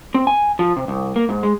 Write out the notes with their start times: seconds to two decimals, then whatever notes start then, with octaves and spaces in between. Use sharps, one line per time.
0.14 C4
0.27 G#5
0.59 F3
0.77 C3
0.88 C2
1.16 A#3
1.29 G#2
1.43 G#3